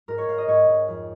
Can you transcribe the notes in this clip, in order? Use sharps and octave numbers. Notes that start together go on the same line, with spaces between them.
G#2 A#4
C#5
G#2 F5
D#5
G#2 C#5
G#2
F2